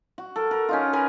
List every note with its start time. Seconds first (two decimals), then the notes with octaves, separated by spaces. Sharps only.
0.18 F#4
0.36 A4 A#4
0.51 A#4
0.69 C#4 D#4 F4
0.93 A#4 B4 G#5